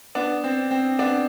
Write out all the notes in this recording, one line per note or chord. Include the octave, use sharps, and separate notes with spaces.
B3 D4
C4
C4
B3 D4